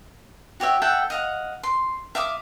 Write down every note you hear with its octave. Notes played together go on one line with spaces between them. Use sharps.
F#4 G4 C#5 E5
A4 E5 F#5 G5
D#5 F5 F#5
C6
E5 F5 D6 D#6